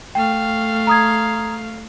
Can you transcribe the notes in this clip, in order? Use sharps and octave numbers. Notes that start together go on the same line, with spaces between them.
A3 F5 G5
A#5 D#6 G#6